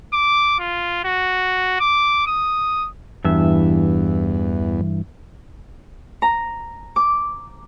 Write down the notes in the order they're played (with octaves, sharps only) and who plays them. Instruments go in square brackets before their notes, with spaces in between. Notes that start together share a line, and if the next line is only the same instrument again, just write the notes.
[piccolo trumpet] D6
F4
F#4
D6
D#6
[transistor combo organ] E2 [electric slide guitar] G2 E3 E5
[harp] A#5
D6